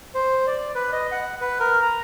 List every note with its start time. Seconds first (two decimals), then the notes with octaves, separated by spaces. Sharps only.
0.15 C5
0.47 D5
0.75 B4
0.92 D#5
1.12 F#5
1.41 B4
1.60 A#4
1.82 A#5